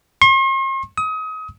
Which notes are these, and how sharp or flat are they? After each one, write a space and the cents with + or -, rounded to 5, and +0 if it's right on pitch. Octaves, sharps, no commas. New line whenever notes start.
C6 +45
D#6 +30